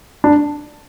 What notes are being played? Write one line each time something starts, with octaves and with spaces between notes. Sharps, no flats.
D4